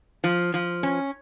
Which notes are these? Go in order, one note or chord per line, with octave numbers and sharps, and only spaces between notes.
F3
F3
C#4